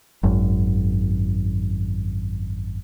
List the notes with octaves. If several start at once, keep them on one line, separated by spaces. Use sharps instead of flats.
G#1 F#2